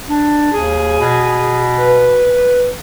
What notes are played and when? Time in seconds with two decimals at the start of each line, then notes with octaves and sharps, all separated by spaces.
0.08 D4
0.52 D#2 G#4
0.99 B2
1.77 B4